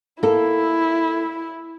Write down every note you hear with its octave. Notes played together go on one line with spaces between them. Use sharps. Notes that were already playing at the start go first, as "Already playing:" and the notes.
A#3 E4 A4